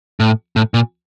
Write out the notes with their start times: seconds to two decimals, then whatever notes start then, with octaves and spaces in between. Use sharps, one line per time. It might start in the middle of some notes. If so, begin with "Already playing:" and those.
0.20 A2
0.56 A2
0.74 A#2